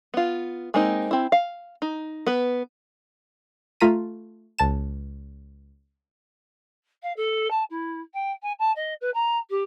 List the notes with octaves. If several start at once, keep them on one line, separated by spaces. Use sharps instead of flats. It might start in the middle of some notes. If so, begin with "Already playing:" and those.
B3 F4
G#3 A#3 C4 D#4
C4 E4
F5
D#4
B3 B4
A3 F4 A#5 B6 D#7
C#2 A5 E7
F5
A4
A5
E4
G5
G#5
A5
D#5
B4
A#5
G4